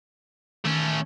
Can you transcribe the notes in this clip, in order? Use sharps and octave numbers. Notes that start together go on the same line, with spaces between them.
D#3 A3 C#4